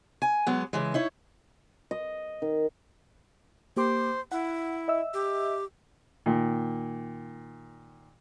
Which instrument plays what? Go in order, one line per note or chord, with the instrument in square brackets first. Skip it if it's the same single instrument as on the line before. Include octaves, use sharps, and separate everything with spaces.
[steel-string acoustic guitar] G#5
F#3 G#3 B3
C#3 E3 G#3
D#4 E4 C#5
[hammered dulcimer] D#5
D#3
[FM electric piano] A#3 G4 D6 [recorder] C5
[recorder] E4 [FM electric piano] F#5
[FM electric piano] D#5 E5 E6
[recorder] G4
[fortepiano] A#2 D#3